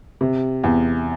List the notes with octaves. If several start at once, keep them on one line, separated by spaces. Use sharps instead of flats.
C3
E2